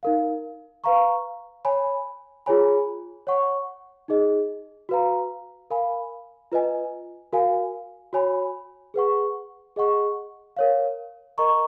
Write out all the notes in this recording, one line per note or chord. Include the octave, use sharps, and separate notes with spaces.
D#4 A#4 F5
B4 F5 A#5 C#6
C#5 G#5 B5
F4 G#4 C#5 G#5 B5
C#5 F#5 C#6
D#4 G#4 D#5
F#4 B4 F5 A#5
A#4 F5 G#5 B5
F4 B4 D#5 G#5
F#4 A#4 F5 G#5
F#4 C#5 G#5 B5
G#4 B4 F#5 C#6
G#4 D#5 F#5 C#6
A#4 C#5 F5
A#4 D#5 A#5 C#6